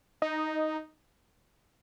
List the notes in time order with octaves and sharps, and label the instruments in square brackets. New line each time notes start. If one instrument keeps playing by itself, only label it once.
[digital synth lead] D#4